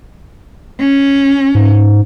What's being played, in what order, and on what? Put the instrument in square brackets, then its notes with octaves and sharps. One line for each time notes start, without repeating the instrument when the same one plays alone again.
[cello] C#4
[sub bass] G#2